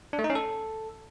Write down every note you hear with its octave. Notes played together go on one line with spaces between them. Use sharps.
D4
A3
D#4
C#4
A4